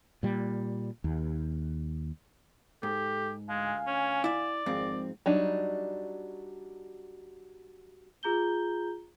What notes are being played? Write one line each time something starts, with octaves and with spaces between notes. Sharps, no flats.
A#2 G3
D#2
G#2 G4 A4
D2 G#3 F5 G#5
C#4
E4 D5 E5
G#1 F2 G#2 C4
F#3 G3 D4 D#4
F4 G#4 A#5 G6 G7